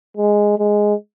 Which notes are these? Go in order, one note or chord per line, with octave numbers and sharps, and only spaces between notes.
G#3
G#3